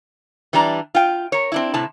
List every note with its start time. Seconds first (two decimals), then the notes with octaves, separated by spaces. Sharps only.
0.53 E3 G3 D4 A#5
0.95 F4 G5
1.32 A#4 C#5
1.52 C4 D4 E4
1.74 A2 C3 E4 A5